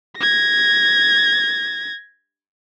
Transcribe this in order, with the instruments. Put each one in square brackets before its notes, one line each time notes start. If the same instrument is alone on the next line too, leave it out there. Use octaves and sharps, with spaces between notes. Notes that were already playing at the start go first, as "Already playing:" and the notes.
[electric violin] G#6 A#6